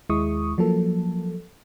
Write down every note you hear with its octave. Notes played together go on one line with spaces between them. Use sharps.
D#2 G#3 E4 C#6 D#6
F3 F#3 A#3 A4